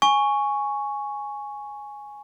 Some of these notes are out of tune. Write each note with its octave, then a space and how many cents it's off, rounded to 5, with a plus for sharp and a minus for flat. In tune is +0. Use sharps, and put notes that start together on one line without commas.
G#5 +0 C#6 +0